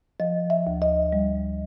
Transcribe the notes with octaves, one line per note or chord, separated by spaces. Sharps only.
F3 D#5
E5
D2
D#5
G3